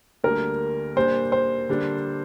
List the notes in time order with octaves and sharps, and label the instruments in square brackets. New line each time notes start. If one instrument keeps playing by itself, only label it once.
[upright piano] D2 D3 G3 A#3 [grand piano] A#4
[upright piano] A#2 G3 A#3 D4 [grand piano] C5
[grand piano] C5
[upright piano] D3 G3 A#3 D4